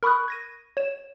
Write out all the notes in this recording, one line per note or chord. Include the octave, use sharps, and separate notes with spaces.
A#4 B5 C#6 D#6 F#6
G#6 A#6 D#7
C#5 E7